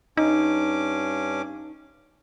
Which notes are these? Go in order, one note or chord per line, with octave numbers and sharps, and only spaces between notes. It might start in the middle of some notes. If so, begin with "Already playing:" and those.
G2 C#4 D#4 D6